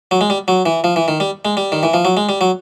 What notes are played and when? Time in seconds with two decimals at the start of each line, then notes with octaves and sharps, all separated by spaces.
0.11 F#3
0.21 G#3
0.30 G3
0.48 F#3
0.66 E3
0.84 F3
0.96 E3
1.08 D#3
1.20 G3
1.45 G#3
1.57 G3
1.72 D#3
1.83 E3
1.94 F3
2.05 F#3
2.17 G#3
2.29 G3
2.41 F#3